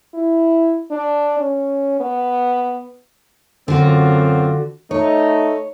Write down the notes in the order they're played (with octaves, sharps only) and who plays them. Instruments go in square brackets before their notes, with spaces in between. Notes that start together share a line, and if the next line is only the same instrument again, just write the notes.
[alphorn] E4
D4
C#4
B3
[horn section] F#2 C4 F4 [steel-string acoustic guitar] D3 F#4
[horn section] A3 D#4 [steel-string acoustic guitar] C#5